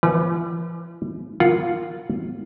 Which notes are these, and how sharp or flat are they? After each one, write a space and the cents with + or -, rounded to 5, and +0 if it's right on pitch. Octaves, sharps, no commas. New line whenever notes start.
E3 +45 B4 -35
F4 +0 A#4 -10 F#5 +0